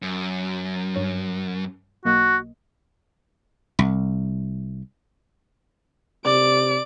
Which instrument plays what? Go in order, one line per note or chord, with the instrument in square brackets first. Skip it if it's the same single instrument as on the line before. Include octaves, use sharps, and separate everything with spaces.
[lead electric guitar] F#2
[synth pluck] G2 C#5
[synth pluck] B1 A#3 D#5 [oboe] F#4
[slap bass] C2
[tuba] C3 [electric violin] D5 D7